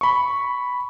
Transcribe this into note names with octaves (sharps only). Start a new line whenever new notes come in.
B5 C#6